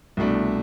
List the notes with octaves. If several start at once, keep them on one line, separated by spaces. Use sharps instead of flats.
C2 B2 A3 D4